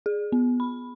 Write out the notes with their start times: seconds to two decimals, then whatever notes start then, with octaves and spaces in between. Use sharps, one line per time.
0.06 G#4
0.32 B3
0.60 B5